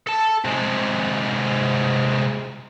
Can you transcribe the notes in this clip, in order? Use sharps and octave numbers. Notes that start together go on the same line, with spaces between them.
A4 A5
C3 G#3